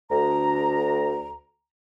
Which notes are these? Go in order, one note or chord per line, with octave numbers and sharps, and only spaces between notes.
D2 A#5